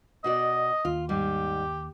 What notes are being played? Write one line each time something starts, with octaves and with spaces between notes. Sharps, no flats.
B2 F#4 D5 D#5
D#2 F4
G#2 G3 G4